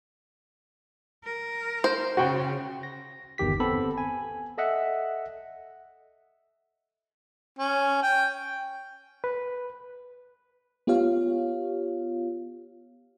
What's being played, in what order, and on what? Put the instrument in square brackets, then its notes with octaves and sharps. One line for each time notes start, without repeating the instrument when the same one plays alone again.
[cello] A#4
[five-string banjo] C5
[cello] C#3 [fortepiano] F#4 G5
[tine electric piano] A#6
G1 E2 D#3 G4 B6
B3 C4 A4 B5
G#5
A4 D#5 E5 F#5
[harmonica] C#4
G5
[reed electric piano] B4
[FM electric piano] B3 F4 G4 C#5 F5